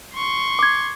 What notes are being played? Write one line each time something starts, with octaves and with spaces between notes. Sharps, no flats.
C6 C#6
D6 G#6